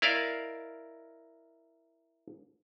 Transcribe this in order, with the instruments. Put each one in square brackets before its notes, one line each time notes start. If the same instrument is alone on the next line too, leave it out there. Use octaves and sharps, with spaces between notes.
[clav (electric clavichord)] E4 A#4 D5 D#5 F5